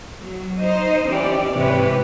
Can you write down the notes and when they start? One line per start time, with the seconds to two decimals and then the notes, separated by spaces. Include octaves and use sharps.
0.21 F#3
0.59 D#4 C5 D#5
1.07 E3 C#4 G4 D5
1.53 G#2 C3 E3 G4 B4 C#5